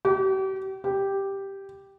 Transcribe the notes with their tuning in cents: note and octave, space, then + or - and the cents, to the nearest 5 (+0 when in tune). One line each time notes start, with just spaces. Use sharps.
G4 -40
G4 +0